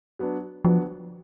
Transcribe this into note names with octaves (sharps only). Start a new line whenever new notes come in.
F#3 B3 D4
F3 F#3 B3 D4